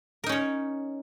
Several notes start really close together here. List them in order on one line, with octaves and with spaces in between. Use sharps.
A#4 D#4 C#4 C#5